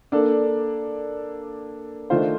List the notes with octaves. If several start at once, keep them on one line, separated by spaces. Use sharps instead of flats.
A#3 D4 A4 D5
D#3 A3 D4 F4 C5